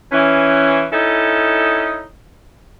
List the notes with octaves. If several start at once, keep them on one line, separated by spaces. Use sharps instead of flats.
E3 C#4
C#4 D#4 E4 A4